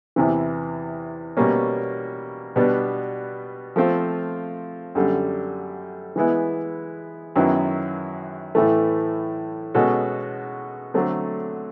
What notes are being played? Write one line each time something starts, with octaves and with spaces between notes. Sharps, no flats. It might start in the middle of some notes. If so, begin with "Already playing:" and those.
E2 C3 E3
B2 G3 A#3 C#4
B2 G3 B3 D4
F3 A3 C4 F4
F#2 D3 G3
E3 G#3 B3 E4
F#2 D#3 F#3 B3 E4
A2 E3 A3
B2 G#3 C#4 F#4 A4
D3 F#3 A3 C4